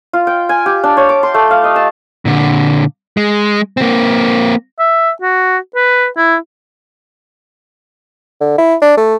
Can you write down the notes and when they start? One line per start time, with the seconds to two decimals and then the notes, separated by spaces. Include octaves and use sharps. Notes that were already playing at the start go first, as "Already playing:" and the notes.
0.13 F4
0.27 G5
0.49 G#5
0.66 G4
0.84 D4
0.97 C#5
1.09 D6
1.23 C6
1.34 A3
1.51 F5
1.64 D#5
1.76 A5
2.25 A#2 D3
3.17 G#3
3.77 A#3 C4
4.79 E5
5.22 F#4
5.75 B4
6.17 E4
8.41 D3
8.58 E4
8.82 D4
8.97 A3